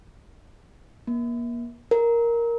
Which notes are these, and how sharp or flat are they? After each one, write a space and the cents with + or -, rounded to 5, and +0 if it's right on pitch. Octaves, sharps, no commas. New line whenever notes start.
A#3 +35
A#4 +5